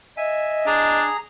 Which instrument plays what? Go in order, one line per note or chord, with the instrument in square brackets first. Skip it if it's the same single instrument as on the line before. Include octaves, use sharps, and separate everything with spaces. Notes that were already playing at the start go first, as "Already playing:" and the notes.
[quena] D#5 [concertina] E5 G#5
[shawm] D4 [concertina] G#4 A#5